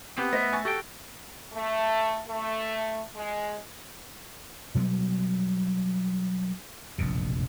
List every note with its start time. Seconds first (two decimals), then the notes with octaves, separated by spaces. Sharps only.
0.18 B3 C4 G4
0.33 A3 C5 D#5 E5 A#6
0.53 G#5 C#6 A6
0.65 F#4 G4 A4 G5
1.53 A3
2.27 A3
3.15 G#3
4.75 B2 F#3 G3 B3
6.98 F1 A#1 F#2 B2